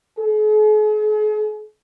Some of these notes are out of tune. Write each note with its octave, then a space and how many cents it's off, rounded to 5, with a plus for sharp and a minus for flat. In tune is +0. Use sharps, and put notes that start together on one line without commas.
G#4 +45